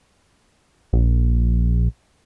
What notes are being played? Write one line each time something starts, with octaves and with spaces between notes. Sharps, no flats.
A#1